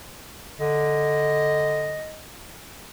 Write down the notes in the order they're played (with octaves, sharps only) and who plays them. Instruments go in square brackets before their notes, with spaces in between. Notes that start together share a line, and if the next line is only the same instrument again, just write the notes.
[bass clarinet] D3 [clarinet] D#5